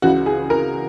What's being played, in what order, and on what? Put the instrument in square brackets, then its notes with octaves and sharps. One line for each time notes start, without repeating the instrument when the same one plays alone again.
[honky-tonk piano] C#2 C#3 E3 F#4
G#4
A#4